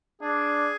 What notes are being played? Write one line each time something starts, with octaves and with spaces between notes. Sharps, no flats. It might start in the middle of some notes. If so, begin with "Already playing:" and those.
D4 G#4